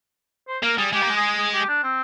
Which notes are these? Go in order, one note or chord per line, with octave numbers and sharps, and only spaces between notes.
C5
A#3 A#4
G3 G#4
G#3 G4
A#3
G#3
G#4
G#4
G4
D4
C4